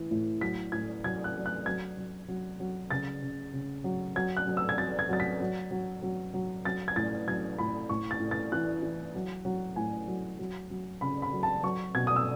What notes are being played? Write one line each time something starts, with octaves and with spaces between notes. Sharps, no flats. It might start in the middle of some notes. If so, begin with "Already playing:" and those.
Already playing: A2 E3
A2
F#3 B6
A2 G#6
F#3 G#6
F#6
F#3
F#6
F#3 G#6
F#3
F#3
F#3
C#3 A6
C#3
C#3
F#3
F#3 G#6
F#6
F#3
E6
G#6
F#3 A6
G#6
F#3 A6
B6
F#3
F#3
F#3
F#3
F#3 A6
G#6
A2 A6
F#3 G#6
A2 B5
A2 C#6
A6
A2
A6
E3 F#6
E3
F#3
F#3
A2 G#5
F#3
F#3
F#3
C#3 B5
B5
F#3
A5
F#3 C#6
B2 G#6
D#6
E6